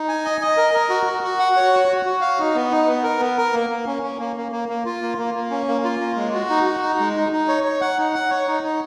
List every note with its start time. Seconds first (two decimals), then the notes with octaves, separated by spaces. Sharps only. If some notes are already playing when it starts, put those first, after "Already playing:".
Already playing: D#4
0.08 G#5
0.25 D#5
0.41 D#5
0.57 A#4
0.74 A#4
0.90 F#4
1.06 F#4
1.23 F#4
1.39 F#5
1.56 C#5
1.73 F#4
1.88 F#4
2.06 F#4
2.21 F5
2.39 D#4
2.55 B3
2.71 D#4
2.87 B3
3.03 A#4
3.20 B3
3.37 A#4
3.53 A#3
3.70 A#3
3.86 C#4
4.03 C#4
4.19 A#3
4.36 A#3
4.52 A#3
4.69 A#3
4.85 F4
5.02 A#3
5.18 A#3
5.34 A#3
5.50 C#4
5.68 A#3
5.84 F4
6.01 A#3
6.16 G#3
6.33 F#4
6.49 D#4
6.65 F#4
6.83 D#4
6.99 G#3
7.16 D#4
7.32 D#4
7.48 C#5
7.64 C#5
7.81 F#5
7.98 D#4
8.14 F#5
8.30 C#5
8.48 D#4
8.63 D#4